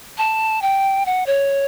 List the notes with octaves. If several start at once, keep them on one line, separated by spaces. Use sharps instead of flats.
A5
G5
F#5
C#5